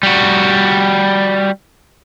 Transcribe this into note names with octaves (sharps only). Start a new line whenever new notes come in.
G3 F#4